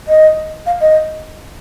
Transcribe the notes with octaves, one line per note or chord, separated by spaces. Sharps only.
D#5
F5
D#5